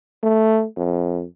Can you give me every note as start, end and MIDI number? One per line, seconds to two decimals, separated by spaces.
0.23 0.65 57
0.77 1.25 41